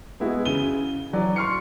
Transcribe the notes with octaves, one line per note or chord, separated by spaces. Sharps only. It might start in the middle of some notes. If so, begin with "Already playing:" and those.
G#3 B3 E4 F#4 G#4
C#3 D#7 G7
E3 F#3 D5
C6 C#6 F6 C7 C#7